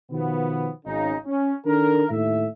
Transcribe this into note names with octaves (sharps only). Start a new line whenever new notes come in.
B2 D#3 F3 B3
G#1 C#3 D#4
C#4
D#3 D4 A4 A#4
D#2 A2 A3 E5